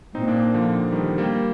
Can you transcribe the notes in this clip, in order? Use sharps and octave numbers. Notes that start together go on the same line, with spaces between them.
A#2 C4 D#4
A#3 D4
D3 F3
D#3 G3
G3 A#3